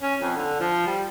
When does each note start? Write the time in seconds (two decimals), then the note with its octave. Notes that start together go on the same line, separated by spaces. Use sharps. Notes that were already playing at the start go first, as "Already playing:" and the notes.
0.02 C#4
0.21 F2
0.36 D3
0.60 F3
0.87 G3